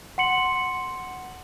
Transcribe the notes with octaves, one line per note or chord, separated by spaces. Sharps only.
F#5 C6 C#7 F#7